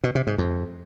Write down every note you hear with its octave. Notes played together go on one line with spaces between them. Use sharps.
B2
C3
G#2
F2